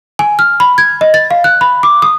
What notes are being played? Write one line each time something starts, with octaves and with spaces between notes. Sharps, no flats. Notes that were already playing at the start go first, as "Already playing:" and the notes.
G#5
F6
B5
G#6
D#5
A6
F5
F#6
B5
D6
D#6